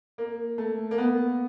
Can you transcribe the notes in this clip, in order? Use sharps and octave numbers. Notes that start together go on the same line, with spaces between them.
A#3
A3
A#3
B3